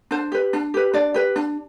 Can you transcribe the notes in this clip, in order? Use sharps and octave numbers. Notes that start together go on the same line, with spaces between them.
D4 C5
G4 B4
D4
G4 B4
D4 D5
G4 B4
D4